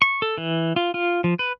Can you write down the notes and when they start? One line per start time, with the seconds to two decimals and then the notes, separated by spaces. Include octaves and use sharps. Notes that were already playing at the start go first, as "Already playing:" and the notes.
0.02 C#6
0.22 A4
0.38 E3
0.76 F4
0.94 F4
1.24 F3
1.39 B4